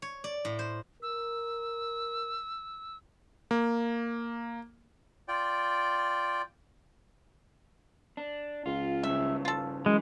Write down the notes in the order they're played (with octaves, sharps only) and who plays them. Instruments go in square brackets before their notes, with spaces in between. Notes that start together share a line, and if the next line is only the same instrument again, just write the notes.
[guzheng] C#5
D5
A2
C5
[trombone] A#4 [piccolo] E6
[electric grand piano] A#3
[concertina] F4 D5 G5
[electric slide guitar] D4
[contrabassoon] C#2 [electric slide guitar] F4
[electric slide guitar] G2 C#3 [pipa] E5
[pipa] F4 A4
[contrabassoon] F#2 [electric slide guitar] E3 [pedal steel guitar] G#3